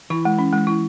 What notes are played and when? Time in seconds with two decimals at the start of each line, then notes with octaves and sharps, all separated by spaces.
0.10 E3 E4
0.25 G#3
0.39 C#4
0.53 G#3
0.67 E4